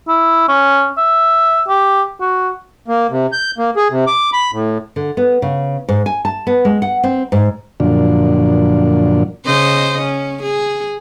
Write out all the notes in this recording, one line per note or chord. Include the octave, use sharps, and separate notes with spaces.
E4
C#4
E5
G4
F#4
A#3
C3
G6
A#3
G#4
C3
D6
B5
A2
D3
B3
C#3
G#2
G#5
A5
B3
G#3
F#5
C4
G#2
F#2 A#2 D3 F3 D4
C#3 C5 D#5
C#4
G#4